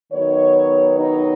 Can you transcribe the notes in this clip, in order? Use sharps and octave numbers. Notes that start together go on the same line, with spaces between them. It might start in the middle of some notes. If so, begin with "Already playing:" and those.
D#3 F#3 B3 D#4 C#5
D#4